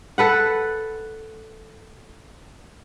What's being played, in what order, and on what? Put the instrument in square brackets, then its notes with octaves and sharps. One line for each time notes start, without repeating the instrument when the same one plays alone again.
[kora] A4 B4 F#5